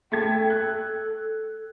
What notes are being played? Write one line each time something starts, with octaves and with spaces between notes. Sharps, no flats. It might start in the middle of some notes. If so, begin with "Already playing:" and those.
A3 A4 G5 G#6
A4 F#6